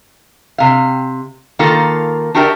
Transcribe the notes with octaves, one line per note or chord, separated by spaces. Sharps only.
C3 F5
D#3 A#3 F4 A4 A#5
D4 F#4 G4 A#4 D5 E5